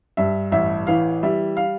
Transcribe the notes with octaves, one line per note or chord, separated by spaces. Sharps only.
G2 E5
A1 E5
E3 F5
G3 E5
F5